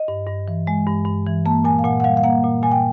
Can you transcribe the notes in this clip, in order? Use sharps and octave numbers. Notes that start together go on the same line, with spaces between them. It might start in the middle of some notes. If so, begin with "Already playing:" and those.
Already playing: D#5
G2
G2
E3
G#3
G2
G2
E3
A#3 A5
A#2 G#5
F5
A#2 F#5
F#5
G3 F5
F5
A#3 F#5
A#2
A#2 G#5
G5